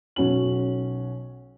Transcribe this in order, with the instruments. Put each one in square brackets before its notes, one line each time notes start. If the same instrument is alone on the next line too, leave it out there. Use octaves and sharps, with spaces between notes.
[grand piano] B1 C#4 F#4 F#7